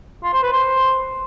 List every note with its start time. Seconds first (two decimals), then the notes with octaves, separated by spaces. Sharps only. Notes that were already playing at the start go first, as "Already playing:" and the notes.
0.23 F4
0.33 C5
0.43 B4
0.53 C5